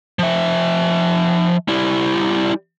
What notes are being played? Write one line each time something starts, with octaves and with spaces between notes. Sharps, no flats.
F3 E5
G3 E4